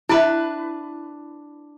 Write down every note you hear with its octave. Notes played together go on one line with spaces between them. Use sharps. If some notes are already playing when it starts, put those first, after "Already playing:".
D4 E4 B4 E5 B5